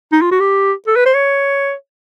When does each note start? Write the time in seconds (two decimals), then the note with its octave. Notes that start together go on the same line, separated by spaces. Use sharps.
0.12 D#4
0.22 F4
0.31 F#4
0.40 G4
0.87 A4
0.96 B4
1.06 C5
1.14 C#5